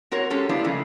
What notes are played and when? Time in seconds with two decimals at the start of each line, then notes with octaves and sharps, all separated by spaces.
0.11 C4 F#4 A#4 C#5
0.30 G#3 C#4 G4 A4
0.49 G3 B3 D4 E4 F4
0.64 C#3 F3 G#3 A3 C4